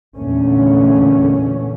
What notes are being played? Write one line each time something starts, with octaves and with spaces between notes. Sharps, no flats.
E2 A#2 D3 A3 C#4